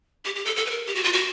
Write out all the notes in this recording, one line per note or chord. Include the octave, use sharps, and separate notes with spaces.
G4
G4
A4
A4
B4
A#4
G4
F#4
F4
F#4